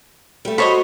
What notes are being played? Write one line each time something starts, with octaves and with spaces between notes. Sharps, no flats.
G3 A3
F#4 A4 C5 C#5 D#5 B5